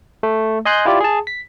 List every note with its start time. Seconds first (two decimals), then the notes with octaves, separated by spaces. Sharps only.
0.23 A3
0.65 D#5 G#5 C6 F#6 G6
0.85 E4 F4 G4 D5
1.00 G#4 A5
1.27 B6